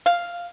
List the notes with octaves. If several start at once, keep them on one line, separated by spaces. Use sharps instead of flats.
F5